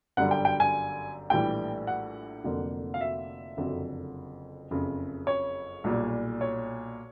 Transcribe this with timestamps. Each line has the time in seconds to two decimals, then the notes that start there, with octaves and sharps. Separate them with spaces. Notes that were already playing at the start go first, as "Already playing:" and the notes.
0.17 G1 F#2 D3 G3 F#5
0.31 G5
0.45 G5
0.60 G#5
1.30 A#1 A2 E3 G3 G5
1.87 F#5
2.44 F1 F2 D3 F#3 A#3
2.94 F5
3.01 E5
3.57 F#1 F2 D3 F#3
4.71 F#1 F2 C#3
5.27 C#5
5.84 B1 A#2 G3
6.41 C#5